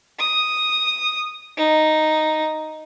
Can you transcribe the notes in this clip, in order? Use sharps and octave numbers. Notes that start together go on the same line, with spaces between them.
D#6
D#4